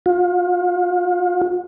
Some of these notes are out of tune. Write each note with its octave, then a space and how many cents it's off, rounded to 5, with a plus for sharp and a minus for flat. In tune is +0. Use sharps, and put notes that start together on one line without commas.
F4 +35